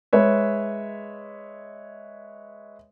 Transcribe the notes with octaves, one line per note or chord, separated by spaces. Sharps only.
G#3 B4 C#5 E5